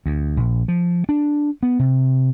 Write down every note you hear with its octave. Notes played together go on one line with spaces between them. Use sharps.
D2
A#1
F3
D4
B3
C3